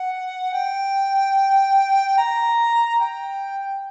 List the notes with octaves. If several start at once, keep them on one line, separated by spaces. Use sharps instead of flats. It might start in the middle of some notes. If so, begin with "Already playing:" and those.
Already playing: F#5
G5
A#5
G5